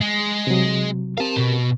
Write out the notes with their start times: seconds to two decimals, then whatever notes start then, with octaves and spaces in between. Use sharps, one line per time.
0.01 G#3
0.47 C3 F#3
1.17 C4 G4 A#4 F5 A5
1.36 B2 B3